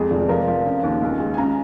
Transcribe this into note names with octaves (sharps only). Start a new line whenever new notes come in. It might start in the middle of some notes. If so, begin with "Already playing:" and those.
Already playing: F2 G#3 G#4
F1
F3 A#4
F3
C#3
D#2
C#2
G#3
G#5
C#3 A#5